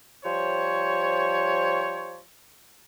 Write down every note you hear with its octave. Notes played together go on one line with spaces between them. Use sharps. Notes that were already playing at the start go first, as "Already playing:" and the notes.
F3 G3 C5 C#5